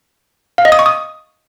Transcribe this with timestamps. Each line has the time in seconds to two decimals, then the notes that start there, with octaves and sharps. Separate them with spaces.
0.58 F5
0.65 D#5
0.72 D#6
0.79 C#6
0.86 D#6